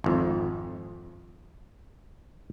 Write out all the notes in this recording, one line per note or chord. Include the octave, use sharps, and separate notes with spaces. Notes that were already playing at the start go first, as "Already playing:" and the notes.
G#1 F2